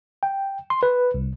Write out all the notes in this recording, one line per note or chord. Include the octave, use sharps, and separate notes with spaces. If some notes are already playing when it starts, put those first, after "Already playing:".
G5
C6
B4
C2